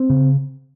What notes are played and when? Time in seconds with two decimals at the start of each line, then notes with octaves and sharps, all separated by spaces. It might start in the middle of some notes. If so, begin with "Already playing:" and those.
Already playing: C4
0.10 C#3